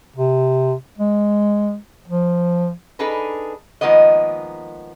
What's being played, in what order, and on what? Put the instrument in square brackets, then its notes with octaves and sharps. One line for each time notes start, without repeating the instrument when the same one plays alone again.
[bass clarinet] C3
G#3
F3
[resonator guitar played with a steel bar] D4 D#4 G#4 A4 B4
D#3 F3 G#3 A#3 B3 D#5